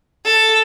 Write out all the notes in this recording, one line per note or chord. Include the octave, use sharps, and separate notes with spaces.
A4